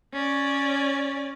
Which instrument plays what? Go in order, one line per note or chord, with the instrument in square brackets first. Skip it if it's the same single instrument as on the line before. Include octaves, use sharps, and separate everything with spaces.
[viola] C#4 D5